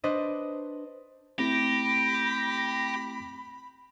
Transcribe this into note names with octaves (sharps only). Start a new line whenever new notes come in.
D4 B4 C5 D#5
A3 C4 E4 G4 B5 A#6